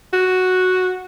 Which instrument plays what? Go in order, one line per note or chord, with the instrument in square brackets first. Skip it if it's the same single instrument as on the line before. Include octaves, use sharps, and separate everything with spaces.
[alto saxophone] F#4